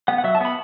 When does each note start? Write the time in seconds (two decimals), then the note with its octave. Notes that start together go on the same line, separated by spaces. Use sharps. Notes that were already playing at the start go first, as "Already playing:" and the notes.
0.08 B3 F#5
0.18 F#5
0.24 F#3 E5
0.35 A5
0.41 B3 B5